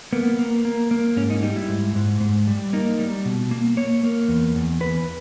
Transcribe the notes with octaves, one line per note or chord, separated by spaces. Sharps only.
A#3 B3
A#3
A#3
A#3
G#2 C#4
D#4
G3 D#4
E4
G#2
G#2
G#2
G3
A#3 D#4
G3
B2
A#3
A#3 C#5
A#3
E2
E2
E2 B4